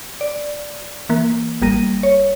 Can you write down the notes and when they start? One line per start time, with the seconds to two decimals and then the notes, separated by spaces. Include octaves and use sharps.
0.21 D5
1.09 E3 A#3
1.62 G#1 G3 A#3 A#6 D#7
2.03 C#5